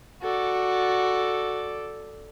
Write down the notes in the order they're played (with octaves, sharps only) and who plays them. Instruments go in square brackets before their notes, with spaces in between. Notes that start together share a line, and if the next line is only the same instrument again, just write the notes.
[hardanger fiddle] F#4 [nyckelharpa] A4 D5